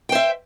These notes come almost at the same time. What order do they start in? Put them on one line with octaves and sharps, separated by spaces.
G5 C5 E5